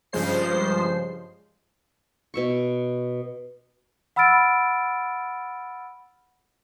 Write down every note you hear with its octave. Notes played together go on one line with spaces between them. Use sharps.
G2 C#3 F3 G#3 C5 C7
B2 E5 C#6
F#5 B5 E6 F6 A6 D7